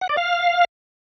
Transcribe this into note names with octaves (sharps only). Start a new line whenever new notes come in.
F#5
D5
F5